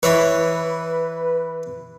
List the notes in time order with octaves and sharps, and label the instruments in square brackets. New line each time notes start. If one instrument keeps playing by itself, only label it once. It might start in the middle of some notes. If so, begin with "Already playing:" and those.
[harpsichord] E3 E4 C#5 [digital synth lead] B4